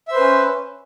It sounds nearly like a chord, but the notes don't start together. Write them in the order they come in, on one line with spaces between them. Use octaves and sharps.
E5 C5 B4 C#4